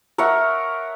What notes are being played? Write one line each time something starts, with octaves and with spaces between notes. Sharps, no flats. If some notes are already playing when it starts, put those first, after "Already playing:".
A#4 C#5 E5 F#5